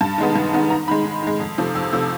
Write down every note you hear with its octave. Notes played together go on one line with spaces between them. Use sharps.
G2 A5
D#3 G#3 B3
G2
D#3 G#3 B3
G#2 A#5
D#3 G#3 B5
G#2
D#3 G#3
F2
C3 F3 A3
F2 E6
C3 F3 A3 E6